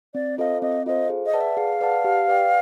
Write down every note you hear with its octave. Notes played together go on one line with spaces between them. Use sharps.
C4 D5
F4 A4 C5 D#5 F5
C4 D#5
F4 A4 C5 D#5 F5
G#4
D#5
B4 D5 F#5 A5
E5
G#4 F5
B4 D5 F#5 A5
G4
B4 D5 G5